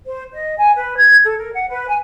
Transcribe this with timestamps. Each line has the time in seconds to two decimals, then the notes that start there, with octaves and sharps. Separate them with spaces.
0.06 C5
0.34 D#5
0.58 G#5
0.76 B4
0.97 G#6
1.24 A4
1.38 A#4
1.52 F#5
1.69 B4
1.88 G#5